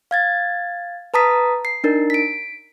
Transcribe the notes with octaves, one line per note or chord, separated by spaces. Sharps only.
F5 G#6 A6
B4 A5 A#5 D#6 B6
C7
D4 D#4 A#4
B6 D7